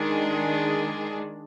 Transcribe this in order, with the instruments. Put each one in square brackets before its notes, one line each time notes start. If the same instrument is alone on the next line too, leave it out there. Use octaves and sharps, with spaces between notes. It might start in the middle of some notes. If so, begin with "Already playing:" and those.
Already playing: [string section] D#3 G#3 D4 G#4